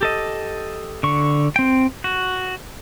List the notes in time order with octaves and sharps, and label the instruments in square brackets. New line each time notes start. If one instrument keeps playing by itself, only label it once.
[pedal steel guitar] G4 A4 D#5
D3 C#6
C4 G5
F#4